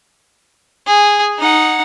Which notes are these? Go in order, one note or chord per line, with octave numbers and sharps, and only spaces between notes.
G#4
D#4 F#5